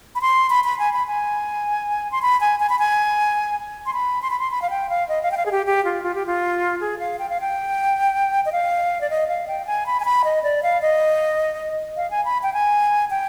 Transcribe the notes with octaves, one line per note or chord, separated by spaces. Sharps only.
B5
C6
B5
B5
G#5
B5
G#5
C6
B5
G#5
G#5
B5
G#5
C6
B5
C6
B5
C6
B5
F5
G5
F5
D#5
F5
G5
F5
G#4
G4
G4
F4
F4
G4
F4
G#4
F5
G5
F5
G5
D#5
F5
D5
D#5
F5
G5
G#5
B5
G#5
B5
D#5
D5
F5
D#5
F5
G#5
B5
G5
G#5
G5